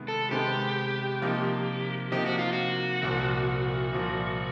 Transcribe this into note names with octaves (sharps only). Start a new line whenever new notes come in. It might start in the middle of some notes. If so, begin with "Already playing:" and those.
Already playing: C3 D#3 G#3 B3
A4
C3 D#3 G#3 B3 G4
C3 F3 A#3 D#4
C3 F3 A#3 D#4 G4
F#4
F4
F#4
C2 A#2 F3
C2 A#2 F3